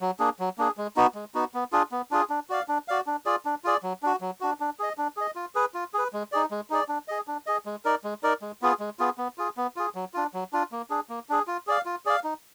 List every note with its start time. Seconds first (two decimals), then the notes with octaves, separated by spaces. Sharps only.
0.01 F#3
0.19 A#3 D4 G#4
0.39 F#3
0.58 A#3 D4 G#4
0.77 G#3
0.96 B3 D#4 F#4
1.15 G#3
1.34 B3 D#4 F#4
1.54 B3
1.72 D4 F4 G#4
1.92 B3
2.11 D4 F4 G#4
2.30 D4
2.50 F#4 D5 F5
2.68 D4
2.88 F#4 D5 F5
3.06 D4
3.26 F4 G#4 D5
3.45 D4
3.64 F4 G#4 D5
3.83 F#3
4.03 D4 F#4
4.21 F#3
4.41 D4 F#4
4.60 D4
4.79 G#4 D#5
4.98 D4
5.17 G#4 D#5
5.36 F4
5.55 G#4 B4
5.74 F4
5.94 G#4 B4
6.13 G#3
6.32 D#4 G#4 D5
6.51 G#3
6.70 D#4 G#4 D5
6.88 D4
7.08 G#4 D#5
7.27 D4
7.46 G#4 D#5
7.66 G#3
7.85 D#4 A#4 D5
8.04 G#3
8.23 D#4 A#4 D5
8.42 G#3
8.62 B3 F4 G#4
8.80 G#3
8.99 B3 F4 G#4
9.18 B3
9.38 F4 G#4
9.57 B3
9.76 F4 G#4
9.95 F#3
10.14 D4 F4
10.34 F#3
10.53 D4 F4
10.72 A#3
10.90 D4 G#4
11.09 A#3
11.29 D4 G#4
11.47 F4
11.67 G#4 D5 F5
11.86 F4
12.05 G#4 D5 F5
12.24 D#4